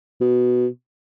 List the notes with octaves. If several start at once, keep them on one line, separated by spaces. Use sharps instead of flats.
B2